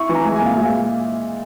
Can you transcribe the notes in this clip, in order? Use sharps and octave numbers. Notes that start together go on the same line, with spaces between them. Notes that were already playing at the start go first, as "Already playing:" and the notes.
Already playing: E4 C#6
E3
A#5
G#3 G#5
G#5
A#2 F5
G#3 E5
F5